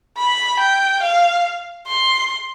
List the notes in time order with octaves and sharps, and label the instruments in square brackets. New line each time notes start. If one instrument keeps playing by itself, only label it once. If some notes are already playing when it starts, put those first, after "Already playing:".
[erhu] B5
G5
F5
C6